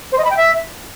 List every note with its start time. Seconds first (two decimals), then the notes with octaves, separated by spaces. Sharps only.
0.12 C5
0.18 D#5
0.24 B5
0.31 G5
0.37 E5